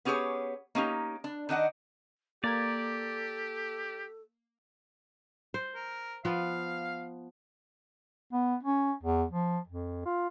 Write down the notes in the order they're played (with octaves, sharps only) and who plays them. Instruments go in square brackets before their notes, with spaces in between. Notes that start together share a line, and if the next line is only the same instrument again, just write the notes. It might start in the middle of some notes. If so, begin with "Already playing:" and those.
[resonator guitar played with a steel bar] B3 C#4 G4 G#4 C#5
A#3 C#4 D#4 G4
D4
D#3 D4 D#5 F#5
[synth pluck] A#3 A#5 G#6 [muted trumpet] G4 [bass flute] A4 [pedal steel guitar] D5
[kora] C5
[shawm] A#4
[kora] F3 B3 [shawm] F5
[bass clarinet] B3
C#4
E2
F3
F2
F4